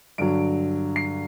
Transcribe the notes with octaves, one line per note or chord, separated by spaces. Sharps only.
G2 D3 F#3 D7
C7